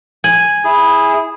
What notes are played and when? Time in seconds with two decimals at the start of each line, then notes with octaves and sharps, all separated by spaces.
0.24 G#5
0.65 E4 G#4